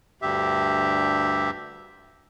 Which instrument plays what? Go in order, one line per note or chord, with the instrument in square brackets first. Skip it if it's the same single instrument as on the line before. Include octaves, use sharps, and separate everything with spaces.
[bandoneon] D2 G2 G4 E5